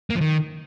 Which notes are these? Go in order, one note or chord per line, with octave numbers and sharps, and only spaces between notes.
A#3
F3
D#3